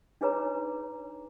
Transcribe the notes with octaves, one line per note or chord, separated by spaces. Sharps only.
D4 D#4 G#4 B4 C#5 A#5